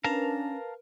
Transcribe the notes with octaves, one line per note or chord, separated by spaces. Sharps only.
C#4 D4 A#4 B4 F5 A5 A#5